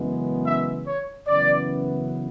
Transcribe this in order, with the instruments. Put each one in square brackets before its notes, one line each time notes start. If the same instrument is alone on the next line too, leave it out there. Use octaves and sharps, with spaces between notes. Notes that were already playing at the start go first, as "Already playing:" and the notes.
Already playing: [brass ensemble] F#2 C#3 E3 G#3 B3
E5
C#5
F#2 C#3 E3 B3 D5